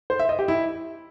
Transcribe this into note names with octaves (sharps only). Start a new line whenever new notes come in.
C5
E5
D#5
G4
E4